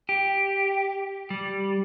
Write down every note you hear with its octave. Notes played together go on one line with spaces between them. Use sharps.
G4
G3